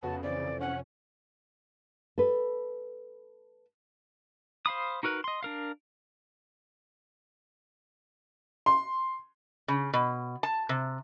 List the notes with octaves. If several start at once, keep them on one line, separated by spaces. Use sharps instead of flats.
F2 C#3 B3 F#4 A5
E3 C4 D5 B5
C3 A4 A#6
C#4 F#5
A4 B4
C5 F5 B5 D#6
D#4 F#4 A#4 B4
D#5 C6
D4 A#4 F5
C6
C#3
B2
A5
C3